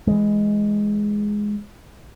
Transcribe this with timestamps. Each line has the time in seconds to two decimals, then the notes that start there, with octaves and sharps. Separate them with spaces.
0.07 E3 G#3